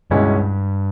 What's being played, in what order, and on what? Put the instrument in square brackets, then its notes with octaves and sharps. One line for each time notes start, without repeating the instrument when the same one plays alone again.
[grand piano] C#2 B2 G#3 C#4 E4 [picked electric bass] G2